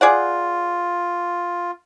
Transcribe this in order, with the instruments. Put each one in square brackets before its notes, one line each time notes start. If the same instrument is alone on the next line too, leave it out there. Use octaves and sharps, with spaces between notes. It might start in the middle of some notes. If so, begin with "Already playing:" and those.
[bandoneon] F4 [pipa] G#4 D5 F#5